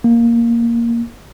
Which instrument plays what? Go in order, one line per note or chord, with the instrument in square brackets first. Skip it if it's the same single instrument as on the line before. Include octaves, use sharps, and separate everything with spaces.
[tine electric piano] A#3